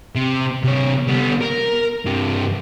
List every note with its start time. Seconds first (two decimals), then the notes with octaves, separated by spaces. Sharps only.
0.16 C3
0.64 C3 C#5
1.08 G3 B3
1.41 A#4
2.05 G2 C3